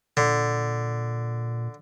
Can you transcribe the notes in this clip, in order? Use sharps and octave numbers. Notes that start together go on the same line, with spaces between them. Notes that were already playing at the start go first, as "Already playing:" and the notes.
A#2 D3